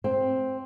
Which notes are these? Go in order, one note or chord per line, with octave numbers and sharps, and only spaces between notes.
C4